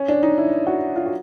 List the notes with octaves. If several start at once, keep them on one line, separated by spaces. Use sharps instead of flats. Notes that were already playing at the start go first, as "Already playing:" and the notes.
Already playing: C#4
D4
D#4
E4
F#4
F4
F#4